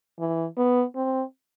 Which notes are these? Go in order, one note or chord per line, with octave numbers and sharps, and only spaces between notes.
E3
B3
C4